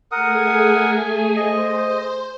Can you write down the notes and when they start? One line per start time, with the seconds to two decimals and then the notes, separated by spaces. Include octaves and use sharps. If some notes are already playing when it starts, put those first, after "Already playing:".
0.12 A3 G#4 A#4 F#5 G#5 D#6
1.36 C5 D#5